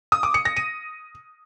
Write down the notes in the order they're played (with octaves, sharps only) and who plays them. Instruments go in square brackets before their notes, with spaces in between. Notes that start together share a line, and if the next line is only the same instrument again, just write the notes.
[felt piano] D#6
D6
C#7
A#6
D#7